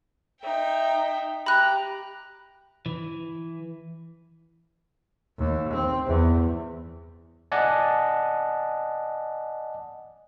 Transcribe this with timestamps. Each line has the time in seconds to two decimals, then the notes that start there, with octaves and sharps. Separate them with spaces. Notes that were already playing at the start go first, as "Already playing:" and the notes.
0.43 D#4 E5 G5
1.46 G4 A#5 B5 F#6
2.86 E3
5.38 D#2
5.73 C4
6.06 E2
7.52 D5 D#5 F#5 G#5 A5